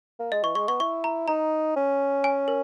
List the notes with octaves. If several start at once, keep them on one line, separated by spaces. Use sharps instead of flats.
A#3
G#3 D#5
E3 C#6
G#3 C#6
B3 C#6
E4 C#6
A#5
D#4 A#5
C#4
G#5
A#4